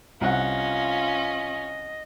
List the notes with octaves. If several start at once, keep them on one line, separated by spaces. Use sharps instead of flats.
C2 C#4 F4 D#5 F#5